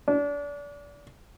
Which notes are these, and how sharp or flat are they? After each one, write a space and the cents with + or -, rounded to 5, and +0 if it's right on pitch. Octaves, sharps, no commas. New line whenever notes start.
D4 -30